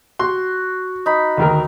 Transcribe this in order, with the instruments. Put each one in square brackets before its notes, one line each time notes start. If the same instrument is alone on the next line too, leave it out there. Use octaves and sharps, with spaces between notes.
[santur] F#4 [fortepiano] C6
[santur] D#4 B5
[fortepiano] D2 D#3 A#4